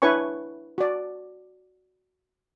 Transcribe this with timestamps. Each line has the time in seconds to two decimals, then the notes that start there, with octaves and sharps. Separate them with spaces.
0.02 D4 E4 B4 C#5 G#5 C#6
0.78 F#4 D5